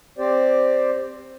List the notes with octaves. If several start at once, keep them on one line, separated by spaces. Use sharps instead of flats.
C4 G4 C5 D5